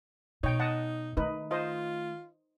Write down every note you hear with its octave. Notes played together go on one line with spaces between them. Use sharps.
B2 D#4 C#5 G5
D#5 F#5 A5
D#3 A3 D#4 B4
F4 C5 D#5